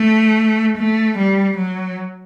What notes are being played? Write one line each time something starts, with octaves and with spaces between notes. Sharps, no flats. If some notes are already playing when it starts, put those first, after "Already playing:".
Already playing: A3
A3
G3
F#3